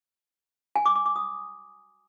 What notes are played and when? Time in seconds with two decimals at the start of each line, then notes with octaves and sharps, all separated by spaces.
0.76 G#5
0.86 D6
0.96 D6
1.06 D6
1.16 D#6